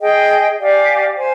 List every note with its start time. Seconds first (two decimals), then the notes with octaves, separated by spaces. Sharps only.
0.01 G#4 D#5 G5
0.58 G4 D5 F5 G#5
1.15 C5 F5 G#5